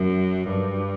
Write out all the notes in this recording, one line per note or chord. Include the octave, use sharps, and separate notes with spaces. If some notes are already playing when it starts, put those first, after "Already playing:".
Already playing: F#2
G2